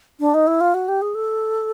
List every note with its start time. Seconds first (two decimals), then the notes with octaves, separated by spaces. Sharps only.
0.20 D4
0.34 D#4
0.47 E4
0.61 F4
0.74 F#4
0.88 G4
1.02 G#4
1.15 A4